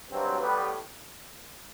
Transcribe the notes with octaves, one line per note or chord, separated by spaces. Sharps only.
G2 F#3 C4
A2 G3 B3 G4 B4